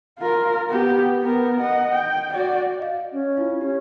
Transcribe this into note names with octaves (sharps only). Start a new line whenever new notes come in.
F4 A#4
B3 G4
B3 A#4
D#5 F#5
G5
F#4 D5
D#5 F5
C#4
E4 F4
C#4 G4